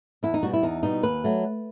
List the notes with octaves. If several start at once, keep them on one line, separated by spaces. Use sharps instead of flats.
E2 E4
D#4
B2 G3 F#4
E4
E2 D#4
B2 G3 D#4
D#2 B4
F#3 A3